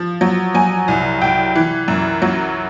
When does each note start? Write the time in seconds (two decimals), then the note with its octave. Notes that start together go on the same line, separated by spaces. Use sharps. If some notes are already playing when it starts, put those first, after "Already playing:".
Already playing: F3
0.21 F#3
0.55 F#3 G#5
0.88 C2
1.21 C2 G5
1.55 E3
1.88 F#2
2.22 F#3